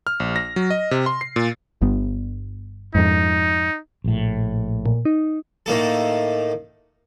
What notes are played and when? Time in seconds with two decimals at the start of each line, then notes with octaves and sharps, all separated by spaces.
0.07 F6
0.20 A#1
0.36 A#6
0.56 F#3
0.70 D#5
0.91 C3
1.06 C6
1.21 C7
1.36 A#2
1.81 G1 G2 B3
2.95 F2 G#2 D#4
4.04 A#1 A2
4.86 A#2
5.05 D#4
5.66 A2 D#3 A#3 A4